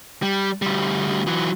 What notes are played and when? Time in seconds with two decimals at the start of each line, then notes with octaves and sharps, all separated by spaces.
0.23 G3
0.62 D2 G3
1.27 E3 F#3